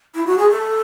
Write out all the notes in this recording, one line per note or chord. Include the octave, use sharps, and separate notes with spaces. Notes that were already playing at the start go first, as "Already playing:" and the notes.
E4
F#4
G#4
A4